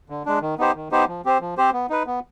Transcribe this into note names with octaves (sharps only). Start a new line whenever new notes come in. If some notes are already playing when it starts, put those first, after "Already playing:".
D3
G#3 D4
D#3
B3 D#4 G4 C5
D#3
B3 D#4 G4 C5
F3
C4 G4 C5
F3
C4 G4 C5
B3
D#4 B4
B3